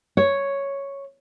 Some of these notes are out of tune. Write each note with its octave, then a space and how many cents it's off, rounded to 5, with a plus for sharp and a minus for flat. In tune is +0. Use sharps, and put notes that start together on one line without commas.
C#5 +0